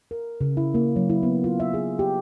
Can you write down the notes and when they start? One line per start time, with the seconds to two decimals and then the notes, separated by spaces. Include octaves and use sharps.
0.11 A#4
0.41 C#3
0.57 E4
0.74 A#3
0.96 F#3
1.10 E4
1.23 B3
1.44 F4
1.60 E5
1.74 G#4
1.99 G4